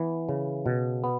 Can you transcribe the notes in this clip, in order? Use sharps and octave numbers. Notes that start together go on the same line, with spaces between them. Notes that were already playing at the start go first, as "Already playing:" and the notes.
Already playing: E3 B3
C#3
B2
B3